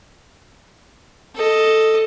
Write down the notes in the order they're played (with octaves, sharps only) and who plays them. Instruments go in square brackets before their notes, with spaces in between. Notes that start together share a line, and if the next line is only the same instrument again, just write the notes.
[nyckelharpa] A4 D#5